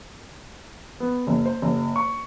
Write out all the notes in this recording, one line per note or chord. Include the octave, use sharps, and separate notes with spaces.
B3
F#1
C5
F#1
C#6